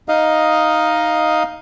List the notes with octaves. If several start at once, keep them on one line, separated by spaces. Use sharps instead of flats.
D#4 D#5 F5